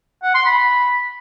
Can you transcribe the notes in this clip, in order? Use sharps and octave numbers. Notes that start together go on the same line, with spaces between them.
F#5
C6
B5